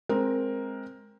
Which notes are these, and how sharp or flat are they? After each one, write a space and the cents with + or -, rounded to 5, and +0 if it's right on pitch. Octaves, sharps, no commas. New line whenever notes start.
G#3 +10 C4 +10 A#4 +5